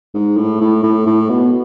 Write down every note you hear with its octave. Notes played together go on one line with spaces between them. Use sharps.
G#2
A2
A2
A2
A2
B2